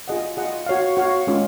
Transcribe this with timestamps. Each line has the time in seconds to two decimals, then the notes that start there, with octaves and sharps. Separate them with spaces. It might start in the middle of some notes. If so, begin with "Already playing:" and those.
0.08 F4 G#4 D#5 F#5
0.37 F4 G#4 D#5 F#5
0.66 F#4 C#5 F5
0.97 F#4 C#5 F5
1.27 G#3 C#4 F4